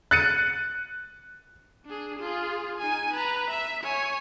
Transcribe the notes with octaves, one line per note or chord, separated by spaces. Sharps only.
F#6 A6 C#7 D#7
D4 G#4
F4 G#4
D#4 G#5
B4 A#5
E5
C#5 G#5